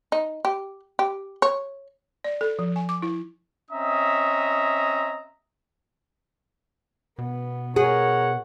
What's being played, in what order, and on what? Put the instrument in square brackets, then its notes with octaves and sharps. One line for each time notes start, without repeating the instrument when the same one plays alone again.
[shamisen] D#4
G4
G4
C#5
[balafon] D5
A4
F3
G#5
D6
E4
[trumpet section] C4 C#4 D#5 E5 A#5 D#6
[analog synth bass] B2 [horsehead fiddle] B3
[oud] G#4 [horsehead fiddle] A#4 C#5 [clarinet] F#5